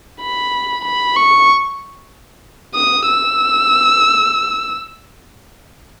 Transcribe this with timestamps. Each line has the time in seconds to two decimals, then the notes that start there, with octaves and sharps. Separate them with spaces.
0.21 B5
0.85 B5
1.16 C#6
2.75 D#6
3.07 E6